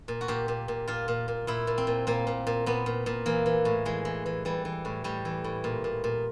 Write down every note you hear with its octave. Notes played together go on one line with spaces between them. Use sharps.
A#2
F#4
A#2 G4
A#2
A#2
A#2 F4
A#2
A#2
A#2 E4
A#2
C4
A#2
A#2 A#3
A#2
A#2
A#2 B3
A#2
A#2
E3 A#3
E3
A2
E3 G#3
E3
E3
E3 G3
E3
A2
A2 G3
E3
A2
A#2
A#2
A#2